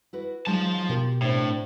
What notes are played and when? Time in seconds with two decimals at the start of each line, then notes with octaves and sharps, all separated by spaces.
0.13 E4 F#4 B4
0.47 F#3 G#3 D#4 F4 A5
0.89 B2 A#3 G4 A#4
1.22 A2 C4 D4